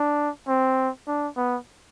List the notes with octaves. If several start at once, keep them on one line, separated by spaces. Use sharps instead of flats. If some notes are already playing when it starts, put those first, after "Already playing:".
Already playing: D4
C4
D4
B3